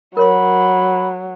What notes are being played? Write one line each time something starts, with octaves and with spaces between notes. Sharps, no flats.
F#3 A#4 C#5 B5 C6